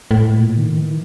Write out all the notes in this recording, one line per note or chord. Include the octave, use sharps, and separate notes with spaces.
A2
A#2
D#3
E3